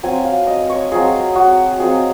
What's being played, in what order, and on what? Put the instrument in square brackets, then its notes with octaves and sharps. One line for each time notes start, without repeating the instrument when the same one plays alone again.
[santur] F#3 C4 F4 G#5
F5
D#5
C#5
F#3 C4 F4 G#4
F#4
F#3 C4 F4 G#4